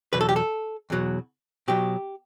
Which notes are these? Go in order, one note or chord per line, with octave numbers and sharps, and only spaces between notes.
E2 B2 F#3 B4
A4
G4
A4
E2 B2 F#3
B2 F#3 G4